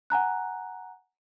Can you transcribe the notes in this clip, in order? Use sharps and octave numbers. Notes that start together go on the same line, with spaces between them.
F#5 G#5 A#5 F#6